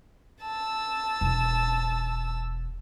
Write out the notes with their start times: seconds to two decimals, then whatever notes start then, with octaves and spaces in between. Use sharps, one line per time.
0.42 A5 E6
1.21 E1